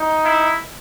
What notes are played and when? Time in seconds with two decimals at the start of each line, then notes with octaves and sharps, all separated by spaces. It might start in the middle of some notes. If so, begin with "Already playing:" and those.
Already playing: D#4
0.25 E4